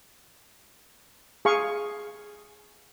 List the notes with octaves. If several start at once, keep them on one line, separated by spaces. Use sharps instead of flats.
G#4 F5 C#6